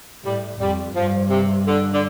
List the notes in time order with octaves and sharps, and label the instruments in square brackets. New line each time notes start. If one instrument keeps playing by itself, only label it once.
[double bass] A2 [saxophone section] G3
[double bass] F2 [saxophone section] G3
[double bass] G2 [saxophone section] F3
[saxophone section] C3
D3
D3